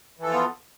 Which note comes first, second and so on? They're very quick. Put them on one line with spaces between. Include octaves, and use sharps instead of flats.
E3 A4 F3 F4 B3